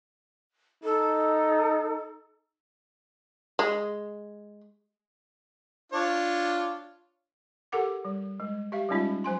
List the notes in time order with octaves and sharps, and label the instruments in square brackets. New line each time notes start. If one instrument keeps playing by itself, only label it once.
[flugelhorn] D#4 [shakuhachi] A4
[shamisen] G#3
[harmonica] D4 F4 C#5
[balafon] G4 A4 A#4 F#5 D6
G3
G#3
G4 E5 F5
G3 G#3 C#4 D#4 F4 E5
F#3 C5 G#5 C6